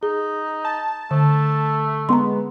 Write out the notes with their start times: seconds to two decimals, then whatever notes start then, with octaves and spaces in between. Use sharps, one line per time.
0.03 D#4 G#4
0.65 A5
1.11 D3 A3
2.09 G#3 B3 A#5 C6